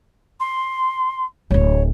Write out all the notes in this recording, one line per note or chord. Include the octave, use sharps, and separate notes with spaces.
C6
D1 G#1 C#5